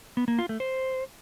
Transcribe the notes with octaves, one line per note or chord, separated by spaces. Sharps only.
B3
A#3
F4
A3
C5